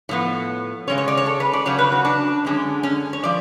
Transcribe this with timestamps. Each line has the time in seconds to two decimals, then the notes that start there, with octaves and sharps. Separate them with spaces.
0.09 A2 F3 B3 C#5
0.88 C#3 G#3 C#4 C#5
0.98 C#5
1.08 D5
1.17 C#5
1.26 A4
1.40 B4
1.53 D5
1.66 C#3 F#3 C#4 C#5
1.79 B4
1.92 F#4
2.05 D4
2.45 F#2 D3 G#3 C#4
2.83 C#4
3.13 C#5
3.24 F3 D5